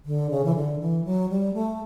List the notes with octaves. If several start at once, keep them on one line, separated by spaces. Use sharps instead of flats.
D3
C#3
E3
D3
E3
F#3
G3
A3